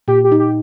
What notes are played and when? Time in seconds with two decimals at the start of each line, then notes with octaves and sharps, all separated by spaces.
0.08 A#2 G4
0.24 G4
0.32 D#4
0.39 G4